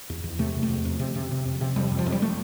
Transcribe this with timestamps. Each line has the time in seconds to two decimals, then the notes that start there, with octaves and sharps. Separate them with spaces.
0.10 E2
0.24 E2
0.39 C3 A3
0.55 E2
0.63 A3
0.69 E2
0.85 F2
0.99 C3
1.15 C3
1.31 C3
1.45 F2
1.61 C3
1.76 F2 G3
1.91 F2
1.99 F3
2.06 F2
2.12 G3
2.22 A3